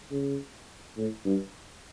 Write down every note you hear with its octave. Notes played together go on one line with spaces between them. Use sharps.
C#3
A2
G2